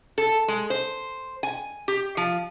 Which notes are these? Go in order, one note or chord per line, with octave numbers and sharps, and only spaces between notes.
A4
G#3
C5
G#5
G4
F3